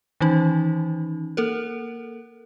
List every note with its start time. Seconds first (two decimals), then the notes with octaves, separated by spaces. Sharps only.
0.20 D#3 E3 C#4 D#4
1.37 A#3 A4 A#4